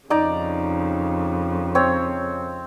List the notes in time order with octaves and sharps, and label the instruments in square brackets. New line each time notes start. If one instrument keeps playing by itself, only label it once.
[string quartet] F2 C#3 [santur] D#4 D5 A#5
[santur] C4 C#5